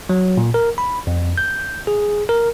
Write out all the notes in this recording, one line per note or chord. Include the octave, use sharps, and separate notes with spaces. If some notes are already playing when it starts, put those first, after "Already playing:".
F#3
A#2
A#4
B5
F2
G6
G#4
A#4